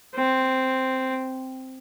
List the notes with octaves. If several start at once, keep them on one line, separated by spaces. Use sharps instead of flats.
C4